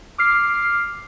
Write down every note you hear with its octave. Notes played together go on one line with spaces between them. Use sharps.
D6 F6 C7